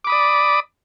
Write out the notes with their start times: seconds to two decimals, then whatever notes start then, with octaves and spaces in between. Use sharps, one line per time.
0.04 D6
0.07 B5
0.10 D#6
0.12 D5